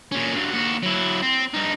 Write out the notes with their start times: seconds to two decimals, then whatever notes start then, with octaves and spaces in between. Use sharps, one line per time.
0.12 A#2 C#4
0.35 G2 F#3
0.53 D#2 F#4
0.83 F#3 E4
1.22 C4
1.54 G2 D#4